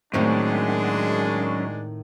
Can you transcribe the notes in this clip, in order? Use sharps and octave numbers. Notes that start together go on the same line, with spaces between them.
F#2 A2 D#3 G#3 C4 D4